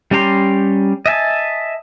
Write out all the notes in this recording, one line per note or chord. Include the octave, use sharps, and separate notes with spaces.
G3 C#4 G4 A#5 C6
D#5 E5 G#5 A5